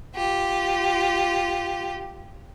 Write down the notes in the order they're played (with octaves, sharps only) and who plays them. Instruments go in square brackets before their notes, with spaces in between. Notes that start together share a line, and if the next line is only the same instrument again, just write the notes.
[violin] F4 G4